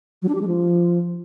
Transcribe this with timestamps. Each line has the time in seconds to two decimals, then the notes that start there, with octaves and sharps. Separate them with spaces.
0.22 F#3
0.28 D4
0.35 G4
0.41 G#3
0.47 F3